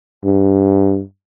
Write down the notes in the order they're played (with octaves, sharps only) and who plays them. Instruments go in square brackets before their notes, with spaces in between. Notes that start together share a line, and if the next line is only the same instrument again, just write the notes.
[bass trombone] G2